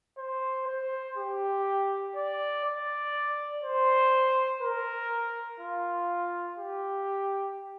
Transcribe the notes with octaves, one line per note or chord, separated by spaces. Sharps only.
C5
C5
G4
D5
D5
C5
A#4
F4
G4